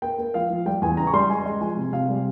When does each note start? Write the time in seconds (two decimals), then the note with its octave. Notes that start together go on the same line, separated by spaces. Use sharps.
0.02 A#3 G5
0.18 A#3
0.34 F3 F5
0.50 F3
0.66 G3 G5
0.82 E2 G#5
0.97 C#3 A#5
1.07 C#6
1.14 G3 C6
1.30 G#3 G#5
1.46 G#3
1.61 F3 G#5
1.77 C3
1.93 C3 F5
2.09 G3